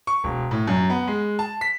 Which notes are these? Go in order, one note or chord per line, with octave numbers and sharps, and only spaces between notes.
C#6
E1
A2
F#2
B3
G#3
A5
B6